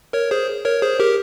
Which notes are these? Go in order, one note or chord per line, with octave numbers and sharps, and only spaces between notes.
A#4 C#5
G#4 C5
A#4 C#5
G#4 C5
G4 A#4